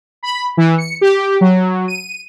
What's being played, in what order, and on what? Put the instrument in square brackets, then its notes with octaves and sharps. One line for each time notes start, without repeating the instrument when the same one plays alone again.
[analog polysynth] B5
E3
C#7
G4
F#3
D#7